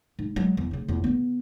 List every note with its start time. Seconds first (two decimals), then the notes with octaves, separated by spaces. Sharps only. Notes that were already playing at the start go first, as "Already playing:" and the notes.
0.19 G#2
0.36 F#3 G#3
0.57 E2
0.71 D2 C#3
0.88 E2 F4
1.04 C#3 B3